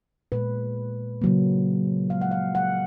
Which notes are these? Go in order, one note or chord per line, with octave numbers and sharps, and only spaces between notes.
A#2 G#3 B4
C#3 F#3 A#3
C#3 F3 G#3 F5
F#5
F5
F#5